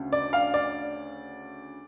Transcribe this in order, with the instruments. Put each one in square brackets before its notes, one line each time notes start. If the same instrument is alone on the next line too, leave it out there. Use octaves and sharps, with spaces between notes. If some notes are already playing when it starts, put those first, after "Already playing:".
Already playing: [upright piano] D2 C#3
D5
F5
D5